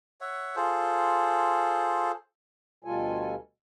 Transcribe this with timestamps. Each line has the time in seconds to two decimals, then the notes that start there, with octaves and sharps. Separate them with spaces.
0.21 C#5 E5 F#5
0.56 F4 G#4 A4 C5
2.84 D2 B2 G3 F4 A4 G#5